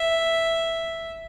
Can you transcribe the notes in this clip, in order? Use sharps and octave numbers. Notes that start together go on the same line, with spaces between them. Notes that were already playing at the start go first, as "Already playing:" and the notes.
Already playing: E5